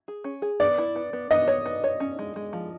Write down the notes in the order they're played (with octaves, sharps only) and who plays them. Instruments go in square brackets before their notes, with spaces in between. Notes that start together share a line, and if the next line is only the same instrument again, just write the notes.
[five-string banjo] G#4
C#4
G#4
[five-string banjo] B3 [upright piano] D5
[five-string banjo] E4
B3
B3
[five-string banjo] B3 [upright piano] D#5
[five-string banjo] C#5
B3
C#5
C#4
G#3
G#3
F3